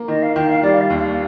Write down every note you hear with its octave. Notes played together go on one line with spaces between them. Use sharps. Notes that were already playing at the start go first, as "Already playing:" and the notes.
Already playing: A#3
D#3 D#5
F5
D#3 G5
F5
G3 D5
F5
D#2
F5